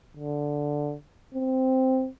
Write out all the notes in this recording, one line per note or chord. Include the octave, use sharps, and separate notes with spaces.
D3
C4